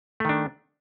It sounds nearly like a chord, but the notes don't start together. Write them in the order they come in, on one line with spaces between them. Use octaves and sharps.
A3 D#3 D4